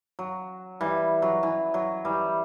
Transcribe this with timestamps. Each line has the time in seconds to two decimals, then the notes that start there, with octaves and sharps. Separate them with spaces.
0.19 F#3
0.80 E3 G3
1.22 F#3
1.43 E3
1.74 F#3
2.05 E3 G3